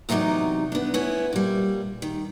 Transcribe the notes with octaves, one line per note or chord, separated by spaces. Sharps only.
E2 C3 F#3 A#3 D#4 D5
B3 D4
B3 C#4 E4
A#2 G3
D#3